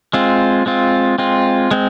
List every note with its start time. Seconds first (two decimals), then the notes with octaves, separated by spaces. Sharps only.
0.13 G#3 C4 F4
0.66 G#3 C4 F4
1.18 G#3 C4 F4
1.71 G#3 C4